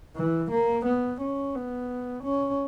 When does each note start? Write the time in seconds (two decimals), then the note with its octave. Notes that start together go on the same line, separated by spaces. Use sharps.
0.16 E3
0.51 A#3
0.85 B3
1.21 C#4
1.55 B3
2.23 C#4